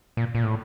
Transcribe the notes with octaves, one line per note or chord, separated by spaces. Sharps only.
A#2
A#2
A2